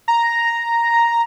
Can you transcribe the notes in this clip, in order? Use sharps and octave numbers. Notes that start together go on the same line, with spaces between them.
A#5